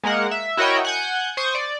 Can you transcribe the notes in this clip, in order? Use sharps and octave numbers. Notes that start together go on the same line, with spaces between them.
G#3 A#3 A#4 F#5
E5
E4 F#4 A#4 C#5 D#5 G5
F#5 G#5 G6
C5 C#6 D#6
D5